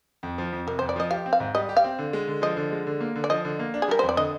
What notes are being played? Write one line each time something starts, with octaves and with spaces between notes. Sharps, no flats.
F2
F3
F2
C3 A#4
F2 C5
D5
F3 D#5
G4 F5
C4
F5
G#2
G3 D#5
G4
F5
C4
D3
G#3
D3
F3 D#5
D3
G#3
D3
A#3
D3
D5
F3 D#5
D3
A#3
D4
G#4
G3 A#4
F2 C5
D5
D3 D#5